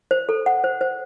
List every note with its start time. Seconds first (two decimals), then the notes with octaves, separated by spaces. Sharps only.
0.11 C5
0.29 A4
0.46 F#5
0.64 C5
0.81 C5